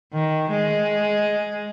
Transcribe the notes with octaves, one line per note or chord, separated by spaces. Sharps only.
D#3
G#3